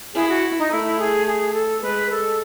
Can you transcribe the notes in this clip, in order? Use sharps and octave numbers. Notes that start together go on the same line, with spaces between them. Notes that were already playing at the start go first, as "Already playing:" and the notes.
E4 G#4
F#4
D#4
A3 E4
G#4
G#4
A4
G#3 B4
A4